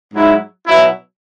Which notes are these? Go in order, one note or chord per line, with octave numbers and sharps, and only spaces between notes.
G#2 F#3 E4
B2 F#3 B3 E4